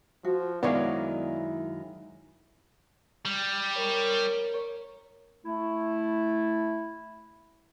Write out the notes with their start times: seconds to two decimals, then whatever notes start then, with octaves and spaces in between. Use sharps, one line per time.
0.25 F3 F#4
0.63 F#2 D#3 G#3 B3 E4 C#5 D5 F5
3.25 G3
3.76 A#4 C#5
5.45 A3 E4